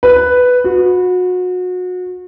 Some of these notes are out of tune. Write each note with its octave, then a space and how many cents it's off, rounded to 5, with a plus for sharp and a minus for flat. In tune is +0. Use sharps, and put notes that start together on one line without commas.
B4 +5
F#4 -30